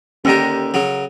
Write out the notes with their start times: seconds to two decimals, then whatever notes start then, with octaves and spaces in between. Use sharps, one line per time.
0.25 D#2 D3 C#4 G4 A4 A#4 A#5
0.74 C#3 F#3